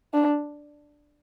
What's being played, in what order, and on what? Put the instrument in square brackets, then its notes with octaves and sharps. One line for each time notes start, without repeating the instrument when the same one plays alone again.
[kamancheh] D4